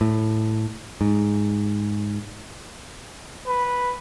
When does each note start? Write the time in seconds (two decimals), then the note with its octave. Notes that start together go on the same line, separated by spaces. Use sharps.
0.01 A2
1.01 G#2
3.47 B4